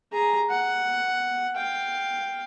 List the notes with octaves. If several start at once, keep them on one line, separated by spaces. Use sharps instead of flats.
G#4 A#5
F#5
F5 G5